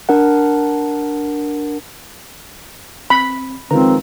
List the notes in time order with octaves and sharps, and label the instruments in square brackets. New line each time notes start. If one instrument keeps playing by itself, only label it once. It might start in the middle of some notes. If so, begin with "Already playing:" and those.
[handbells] D4 A#4 F#5
[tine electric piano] C4 [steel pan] B5
[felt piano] D#3 F3 G#3 [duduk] C4 [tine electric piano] A#4 B4 A#5